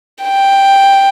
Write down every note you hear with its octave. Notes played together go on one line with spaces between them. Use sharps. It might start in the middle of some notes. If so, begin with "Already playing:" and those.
G5